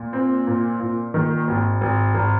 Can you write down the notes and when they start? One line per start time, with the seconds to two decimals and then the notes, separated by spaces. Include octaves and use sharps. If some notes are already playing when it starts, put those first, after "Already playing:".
Already playing: A#2
0.13 C4
0.47 A#2
0.80 A#2
1.14 D#3
1.48 G#1
1.81 G#1
2.15 G#1